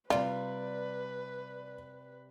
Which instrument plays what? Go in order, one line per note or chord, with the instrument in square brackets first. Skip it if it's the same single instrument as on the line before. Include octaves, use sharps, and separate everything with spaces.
[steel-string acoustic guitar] C3 G3 [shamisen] F4 [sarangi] B4 [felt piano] D5